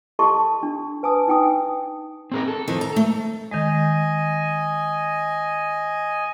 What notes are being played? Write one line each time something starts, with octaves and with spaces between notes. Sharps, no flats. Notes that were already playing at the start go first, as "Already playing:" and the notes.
G4 A4 D#5 A5 C6 C#6
D4
B4 G#5 A5 D#6
D#4 B4 G5 G#5 D#6
C4 G#4 A#4
A4
F2 D#3 E3
A#5
A3
D#3 G#3 D#5 G#5